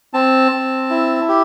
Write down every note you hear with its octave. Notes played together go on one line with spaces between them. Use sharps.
C4 A5
C4
E4
G4